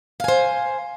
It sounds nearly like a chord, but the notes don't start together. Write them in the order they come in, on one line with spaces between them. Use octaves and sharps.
F5 G#5 C5